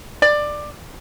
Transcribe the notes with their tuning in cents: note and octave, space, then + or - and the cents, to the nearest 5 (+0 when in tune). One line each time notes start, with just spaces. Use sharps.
D5 +15